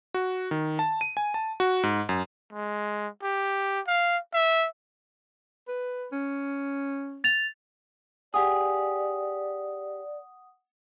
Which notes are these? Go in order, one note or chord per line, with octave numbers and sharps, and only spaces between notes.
F#4
D#3
A5
D#7
G#5
A5
F#4
G#2
F#2
G#3
G4
F5
E5
B4
C#4
A6 F7
G4 G#4 D5 F#5 D#6